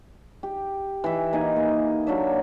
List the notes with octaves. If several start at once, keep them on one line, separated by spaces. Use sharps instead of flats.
G4
E3 E5
A#3 D#4 G#5
A#3
F#3 A#3 D4 E5